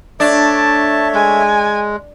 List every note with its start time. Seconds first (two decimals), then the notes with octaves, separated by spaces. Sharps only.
0.20 A3 D4 C#5 E5 A5
1.14 G#3 G#5